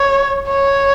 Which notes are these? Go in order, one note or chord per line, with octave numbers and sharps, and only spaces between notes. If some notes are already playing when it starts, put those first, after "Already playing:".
Already playing: C#5
C#5